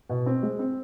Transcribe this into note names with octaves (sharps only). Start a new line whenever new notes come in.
B2
C4
G#3
C4